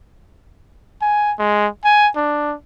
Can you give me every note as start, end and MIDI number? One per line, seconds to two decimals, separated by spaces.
1.02 1.33 80
1.39 1.67 56
1.84 2.09 80
2.16 2.55 62